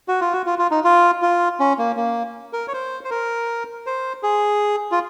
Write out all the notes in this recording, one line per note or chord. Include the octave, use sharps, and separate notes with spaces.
F#4
F4
F#4
F4
F4
D#4
F4
F4
C#4
A#3
A#3
A#4
C#5
C5
C5
A#4
C5
G#4
F4